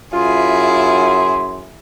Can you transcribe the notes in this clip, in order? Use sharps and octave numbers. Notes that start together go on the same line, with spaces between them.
F#2 E4 F4 G#4 C6